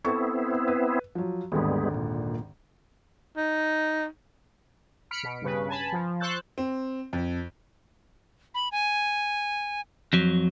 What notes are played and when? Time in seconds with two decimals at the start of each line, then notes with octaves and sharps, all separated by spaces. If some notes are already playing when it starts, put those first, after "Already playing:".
0.05 B3 C4 E4 A4 C#6
0.68 B4
1.15 F3 F#3
1.52 G#1 D#2 D3 G3 G#3 B3
1.94 A#2
3.37 D#4
5.11 B5 F6 B6 C#7 D7
5.23 B2
5.42 G2 C#3 B4
5.69 G#5 A5 B5
5.92 F3
6.20 C5 C#6 E6 F#6 G6 A6
6.58 C4
7.13 F2
8.55 B5
8.72 G#5
10.13 F2 F#3